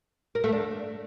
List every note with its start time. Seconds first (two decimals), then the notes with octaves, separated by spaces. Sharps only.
0.35 A#4
0.44 A3
0.52 D4